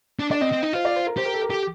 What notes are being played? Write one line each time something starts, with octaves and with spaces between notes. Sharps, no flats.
D4
D4 D5
C4 D#5
C4
D#4
F4 C5
D5
C5
A#4
G4 C5
A#4
A4
A#4
G4 A4